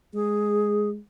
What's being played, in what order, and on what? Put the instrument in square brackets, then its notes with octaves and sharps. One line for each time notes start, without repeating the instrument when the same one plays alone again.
[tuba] G#3 [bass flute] G#4